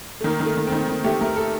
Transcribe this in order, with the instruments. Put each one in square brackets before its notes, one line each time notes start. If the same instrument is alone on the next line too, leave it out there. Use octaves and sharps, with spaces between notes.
[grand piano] A3
[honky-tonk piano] D#3 [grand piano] A#3
[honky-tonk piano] D#3
[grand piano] A3
[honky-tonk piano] D#3
[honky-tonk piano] D#3 [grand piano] C4
[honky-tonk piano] D#3
[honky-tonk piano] A3 [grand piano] G4
[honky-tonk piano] A3 [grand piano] A#4
[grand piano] A4